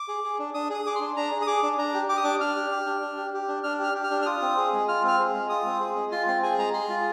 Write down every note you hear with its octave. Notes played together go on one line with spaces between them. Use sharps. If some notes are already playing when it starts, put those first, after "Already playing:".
Already playing: D6
G#4
G#4
D4
D4 D#6
G#4 D#6
G#4 D6
D4 C6
D4 A#5
G#4
D#6
G#4 D6
D4
D4 A#5
G4
G4 D6
D#6
D4 D6
D4 F6
G4
G4
D4
D4
G4
G4
D4
D4 F6
G4 F6
G4
F6
D4
F6
F4 D#6
C4
G#4
G#3
F4 F6
C4 F6
G#4
G#3
F4 D#6
C4
G#4
G#3
F4 C6
C4 C6
G#4 G#5
G#3 A#5
G#4 C6
F4